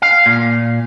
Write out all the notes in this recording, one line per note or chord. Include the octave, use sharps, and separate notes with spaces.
F5
A#2